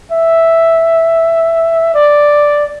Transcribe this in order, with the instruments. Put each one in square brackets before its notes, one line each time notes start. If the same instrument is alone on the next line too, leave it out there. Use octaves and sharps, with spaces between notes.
[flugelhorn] E5
D5